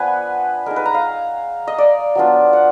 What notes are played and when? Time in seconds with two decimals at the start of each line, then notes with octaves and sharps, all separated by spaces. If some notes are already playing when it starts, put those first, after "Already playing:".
Already playing: F3 B3 D4 B4 F#5 G#5
0.66 G#3 D#4 A#4
0.76 B4
0.86 A#5
0.94 F5
1.67 D#5
1.78 D5
2.15 F#3 B3 D4 F4
2.53 F#5